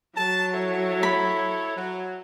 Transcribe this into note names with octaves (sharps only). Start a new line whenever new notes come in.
F#3 A5
E4 A4 C#5
B5
F#3